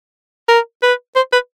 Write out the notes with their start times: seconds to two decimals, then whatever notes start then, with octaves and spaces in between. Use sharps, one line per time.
0.48 A#4
0.82 B4
1.16 C5
1.32 B4